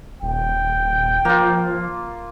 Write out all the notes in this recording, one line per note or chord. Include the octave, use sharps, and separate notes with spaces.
D#1 G5
F3 A#3 F4